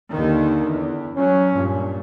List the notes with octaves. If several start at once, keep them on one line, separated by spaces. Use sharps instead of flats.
D#2 D3 D#3
E2
F#3 C#4
G2 A#2